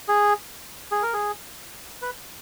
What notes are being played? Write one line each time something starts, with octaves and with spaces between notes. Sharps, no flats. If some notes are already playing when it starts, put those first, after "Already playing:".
G#4
G#4
A#4
G#4
B4